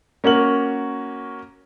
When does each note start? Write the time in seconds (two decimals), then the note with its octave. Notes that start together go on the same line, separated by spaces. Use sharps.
0.24 A#3 C#4 F#4 A#4 F#7